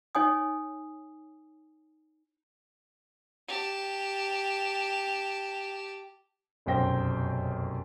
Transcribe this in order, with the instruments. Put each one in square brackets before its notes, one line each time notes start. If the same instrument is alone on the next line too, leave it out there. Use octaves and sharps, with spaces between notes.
[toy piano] D#4 C#5 G#5 D#6
[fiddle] G4 A5
[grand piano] F1 B1 F#2 C5 G5 A#6